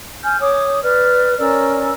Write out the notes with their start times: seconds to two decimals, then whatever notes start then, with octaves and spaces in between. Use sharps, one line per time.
0.23 G#5 F6 G6
0.40 C#5 D6 D#6
0.82 B4 D5 F6
1.38 C#4 A#4 D5 E6